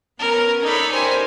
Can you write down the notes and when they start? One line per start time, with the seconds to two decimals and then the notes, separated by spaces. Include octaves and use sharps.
0.19 B3 C#4 A#4
0.62 D#4 A4 C#5 D5 B5
0.91 D#4 G4 A#4 C5 G#5